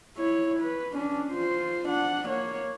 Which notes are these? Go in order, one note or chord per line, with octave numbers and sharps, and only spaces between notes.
E4 C#5
B4
C#4 D4
F4 C5
D4 F#5
A#3 C#5